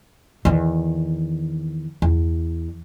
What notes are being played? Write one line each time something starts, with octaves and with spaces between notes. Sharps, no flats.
E2 D#3
E2